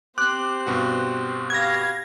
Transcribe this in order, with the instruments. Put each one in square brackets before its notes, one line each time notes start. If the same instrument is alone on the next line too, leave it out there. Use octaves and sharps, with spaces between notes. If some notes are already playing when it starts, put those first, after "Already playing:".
[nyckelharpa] C4 G4 [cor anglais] C5 [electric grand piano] D6 [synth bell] F#6
[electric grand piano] G2 B2 F#4
[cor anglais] B3 [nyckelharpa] G4 F5 [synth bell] G#6 A#6